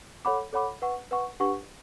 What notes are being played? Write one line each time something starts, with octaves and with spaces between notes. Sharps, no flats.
A4 C#5 F#5 B5 D6
A4 C#5 F#5 B5 D6
B4 F#5 C#6
B4 F#5 C#6
D4 G4 B4 F#5 C#6